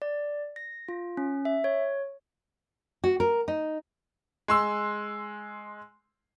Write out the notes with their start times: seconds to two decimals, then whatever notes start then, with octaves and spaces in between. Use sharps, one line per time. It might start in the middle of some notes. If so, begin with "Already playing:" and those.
0.02 D5
0.56 A#6
0.89 F4
1.17 C#4
1.45 E5
1.64 C#5
3.04 F#4
3.20 A#4
3.48 D#4
4.48 G#3 C6 E6